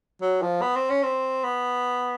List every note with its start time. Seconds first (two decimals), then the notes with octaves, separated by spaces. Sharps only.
0.21 F#3
0.42 F3
0.62 B3
0.76 C4
0.90 C#4
1.03 C4
1.44 B3